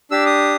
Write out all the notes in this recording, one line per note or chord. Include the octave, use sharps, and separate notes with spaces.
D4 G4 E6
D#6